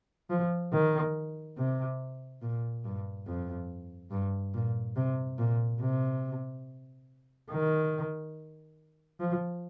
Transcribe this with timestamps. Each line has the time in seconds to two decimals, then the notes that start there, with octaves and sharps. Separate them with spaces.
0.30 F3
0.73 D#3
1.57 C3
2.42 A#2
2.84 G2
3.27 F2
4.11 G2
4.54 A#2
4.96 C3
5.38 A#2
5.81 C3
7.51 D#3
9.20 F3